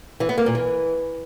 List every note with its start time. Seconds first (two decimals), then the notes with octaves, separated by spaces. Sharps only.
0.20 E3
0.29 B3
0.38 A#3
0.46 A#2
0.55 E3